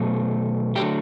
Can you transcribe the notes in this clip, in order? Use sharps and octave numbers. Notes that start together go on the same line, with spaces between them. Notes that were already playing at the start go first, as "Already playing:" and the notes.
Already playing: B2 F#3 A3
D3 F#3 A3 G4